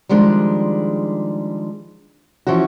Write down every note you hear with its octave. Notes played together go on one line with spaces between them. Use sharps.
D#3 F3 G3 G#3 D4
E3 F3 C#4 F#4